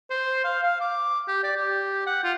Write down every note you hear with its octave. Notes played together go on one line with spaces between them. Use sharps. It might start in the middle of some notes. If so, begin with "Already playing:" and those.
C5
F5
F5
D6
G4
D5
G4
F#5
F4